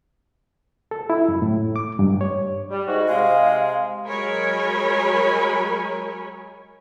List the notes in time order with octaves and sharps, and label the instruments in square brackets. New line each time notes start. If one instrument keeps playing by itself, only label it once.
[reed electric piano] A4
E4
F#2
A2
D6
G2
C#5
[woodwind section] G3
G#2 F#4
[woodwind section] C3 G#3 [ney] F5
[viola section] F#3 G#3 A#4 C#5 G#5 B5